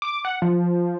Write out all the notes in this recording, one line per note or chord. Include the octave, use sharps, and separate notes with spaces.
D6
F#5
F3